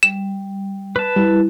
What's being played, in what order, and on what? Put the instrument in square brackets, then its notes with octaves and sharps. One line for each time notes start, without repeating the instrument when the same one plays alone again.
[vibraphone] G3 [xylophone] E7
[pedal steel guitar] B4 A5
[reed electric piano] G3 [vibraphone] E4